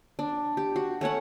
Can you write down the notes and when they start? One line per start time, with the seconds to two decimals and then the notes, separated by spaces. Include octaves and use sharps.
0.19 D4
0.57 G4
0.76 F#4
1.01 A3 C#4 C#5 F#5